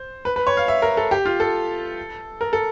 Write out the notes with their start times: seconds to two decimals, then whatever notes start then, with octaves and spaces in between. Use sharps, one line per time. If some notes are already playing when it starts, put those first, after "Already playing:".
Already playing: C5
0.25 B4
0.36 B4
0.47 C#5
0.57 F5
0.68 E5
0.82 A#4
0.97 A4
1.11 G4
1.26 F4
1.40 A4
2.41 A#4
2.53 A4